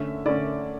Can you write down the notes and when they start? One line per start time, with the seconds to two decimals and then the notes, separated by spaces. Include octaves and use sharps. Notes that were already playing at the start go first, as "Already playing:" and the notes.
Already playing: D3 A3 C#4 E5
0.25 D3 A3 C#4 D5